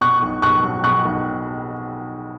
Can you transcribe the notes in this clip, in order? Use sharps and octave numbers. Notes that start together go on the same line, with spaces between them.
B2 C#6 F#6
B1
B1 C#6 F#6
F#3
B2 C#6 F#6
B1